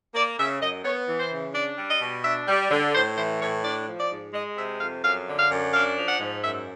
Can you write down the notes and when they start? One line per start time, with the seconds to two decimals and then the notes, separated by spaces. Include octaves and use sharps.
0.15 A#3 D5
0.38 C#3 E5
0.61 F#2 D#5
0.85 B3 C#5
1.08 E3
1.20 C5
1.32 C#3
1.54 D4 D5
1.78 G3
1.90 D#5
2.02 B2
2.25 D4 E5
2.48 G3
2.71 D3
2.95 A2 C5
3.17 E3 C5
3.41 A2 C#5
3.64 D4 D5
3.88 F3
3.99 D5
4.11 G#2
4.34 G#3 D#5
4.57 C3 E5
4.81 F2 F5
5.04 F#2 F5
5.28 D3
5.39 F5
5.51 F#2
5.74 D4 F5
5.97 F3
6.09 F#5
6.20 G#2
6.44 F#2 E5